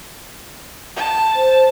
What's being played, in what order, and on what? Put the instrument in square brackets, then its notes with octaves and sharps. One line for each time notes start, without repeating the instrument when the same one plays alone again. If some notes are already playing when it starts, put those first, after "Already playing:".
[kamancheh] A5
[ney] C5